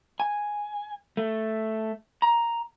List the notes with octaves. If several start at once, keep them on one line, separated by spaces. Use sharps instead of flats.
G#5
A3
A#5